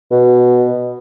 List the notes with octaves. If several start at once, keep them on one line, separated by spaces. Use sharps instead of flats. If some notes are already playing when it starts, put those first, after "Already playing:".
B2